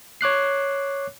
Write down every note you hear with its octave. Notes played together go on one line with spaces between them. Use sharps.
C#5 D6 F#6 C7